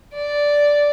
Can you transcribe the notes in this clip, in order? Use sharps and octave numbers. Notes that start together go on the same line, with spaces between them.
D5